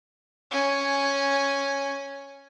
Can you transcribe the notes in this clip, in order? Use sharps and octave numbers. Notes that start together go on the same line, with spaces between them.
C#4 G#5